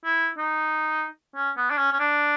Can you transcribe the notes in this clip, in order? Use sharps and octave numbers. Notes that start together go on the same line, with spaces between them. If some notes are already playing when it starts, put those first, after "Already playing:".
E4
D#4
C#4
B3
D4
C#4
C#4
D4